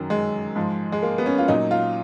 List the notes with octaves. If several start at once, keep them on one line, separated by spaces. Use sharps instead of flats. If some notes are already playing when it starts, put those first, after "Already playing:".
Already playing: F#2 D#3 F#3
G#3
G#2 F3
G#3
A#3
B3
C#4
F4
A#2 F#3 D#4
F4